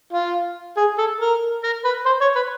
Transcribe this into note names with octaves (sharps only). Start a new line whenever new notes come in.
F4
G#4
A4
A#4
A#4
B4
C5
C#5
B4